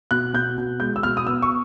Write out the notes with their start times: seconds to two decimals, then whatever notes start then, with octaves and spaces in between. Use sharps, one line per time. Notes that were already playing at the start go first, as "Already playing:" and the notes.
0.11 B2 F#6
0.34 B2 G6
0.58 B2
0.80 G#3 G6
0.96 E6
1.03 B2 F6
1.17 D#6
1.27 B3 E6
1.42 C#6